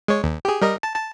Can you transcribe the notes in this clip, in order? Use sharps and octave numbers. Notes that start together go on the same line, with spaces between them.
G#3 C#5
D#2
G4 G#4
G3 A#4 D#5
A5
A5